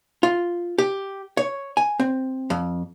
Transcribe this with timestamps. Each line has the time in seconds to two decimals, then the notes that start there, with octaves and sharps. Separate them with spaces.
0.23 F4
0.78 G4
1.37 C#5
1.77 G#5
2.00 C4
2.50 F2